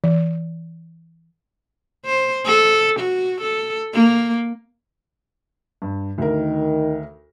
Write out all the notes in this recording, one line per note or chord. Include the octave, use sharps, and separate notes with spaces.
E3
C5
A4
F#4
A4
A#3
G2
D2 D#3 A#4